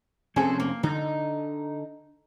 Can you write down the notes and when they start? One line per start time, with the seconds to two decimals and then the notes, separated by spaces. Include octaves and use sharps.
0.36 F1 C4 C#4 G#4 A4 C5
0.60 A#3
0.83 D3 D#4